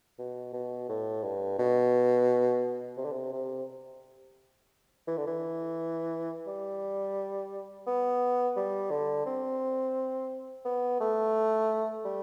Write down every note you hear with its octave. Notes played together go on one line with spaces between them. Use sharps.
B2
B2
A2
G2
B2
C3
D3
C3
C3
E3
D3
E3
G3
B3
G3
D3
C4
B3
A3
G3